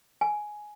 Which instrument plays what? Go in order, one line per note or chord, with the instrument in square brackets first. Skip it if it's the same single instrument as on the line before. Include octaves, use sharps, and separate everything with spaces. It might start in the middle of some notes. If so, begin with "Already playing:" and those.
[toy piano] G#5